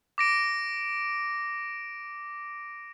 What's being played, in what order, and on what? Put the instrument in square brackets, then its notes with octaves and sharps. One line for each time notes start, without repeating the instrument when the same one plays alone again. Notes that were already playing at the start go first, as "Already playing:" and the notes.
[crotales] D6 A#6 D7